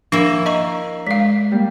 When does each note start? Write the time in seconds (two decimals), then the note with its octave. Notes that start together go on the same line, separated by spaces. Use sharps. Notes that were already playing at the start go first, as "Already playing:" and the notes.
0.12 F3 A#3 D4 E4
0.46 D#5 A#5 C#6
1.07 G#3 F5 B6
1.52 G3 A#3